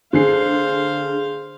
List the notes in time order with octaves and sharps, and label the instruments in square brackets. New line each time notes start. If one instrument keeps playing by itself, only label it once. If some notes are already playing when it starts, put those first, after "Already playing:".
[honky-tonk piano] D3 G#4 C7 [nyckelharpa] C5 F5